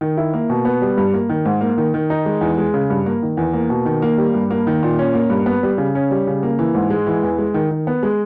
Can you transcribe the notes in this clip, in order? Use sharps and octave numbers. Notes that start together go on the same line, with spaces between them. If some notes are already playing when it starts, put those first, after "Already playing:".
D#3
E4
A#3
B2
B3
G3
G2
A#3
D#3
G#2
A#3
D#3
D#3
D#4
G#3
E2
G#3
C#3
G2
A#3
D#3
E2
A#3
B2
D#3
A#3
G3
G2
A#3
D#3
A#2
C#4
A#3
G2
B3
G3
C#3
C#4
G3
C#3
A#3
E3
G#2
G#3
E3
E2
G#3
D#3
D#3
B3
G#3